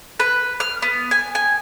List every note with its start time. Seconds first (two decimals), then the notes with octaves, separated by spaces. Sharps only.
0.20 B4
0.60 F6
0.82 B3
1.11 G#5
1.35 G#5